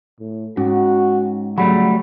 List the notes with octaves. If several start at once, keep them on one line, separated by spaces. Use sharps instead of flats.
A2
G#2 C#4 F#4
C#3 F#3 G3 A3 F#5 B5